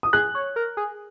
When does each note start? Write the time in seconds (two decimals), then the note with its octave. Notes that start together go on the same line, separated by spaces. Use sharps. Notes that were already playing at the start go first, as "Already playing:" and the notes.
0.03 D#6
0.13 G#4 F#6
0.35 C#5
0.56 A#4
0.77 G#4